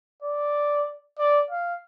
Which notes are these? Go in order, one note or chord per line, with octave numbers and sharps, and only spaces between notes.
D5
D5
F5